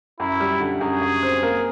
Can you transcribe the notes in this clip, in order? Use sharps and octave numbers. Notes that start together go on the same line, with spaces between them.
F#2 E4
G3
D3
F#2 G#4
F#2
C4
A#3